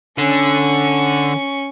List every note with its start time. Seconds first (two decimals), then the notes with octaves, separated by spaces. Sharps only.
0.18 D3 C#4 C#6